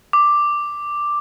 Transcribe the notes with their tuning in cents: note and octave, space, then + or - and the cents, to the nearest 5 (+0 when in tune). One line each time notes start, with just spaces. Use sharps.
D6 +5